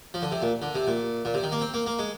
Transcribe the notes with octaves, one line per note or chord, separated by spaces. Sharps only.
F3
D3
C3
A#2
D3
C3
A#2
A#2
C3
D#3
A#3
C4
A#3
A#3
G#3